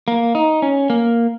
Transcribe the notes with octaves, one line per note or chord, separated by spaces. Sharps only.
A#3
D#4
C#4
A#3